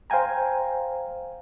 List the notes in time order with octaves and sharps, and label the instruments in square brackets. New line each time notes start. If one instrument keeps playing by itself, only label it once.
[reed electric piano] C5 F5 G5 G#5 A#5